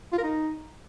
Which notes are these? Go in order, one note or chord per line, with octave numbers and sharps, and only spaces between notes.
F4
A#4
D#4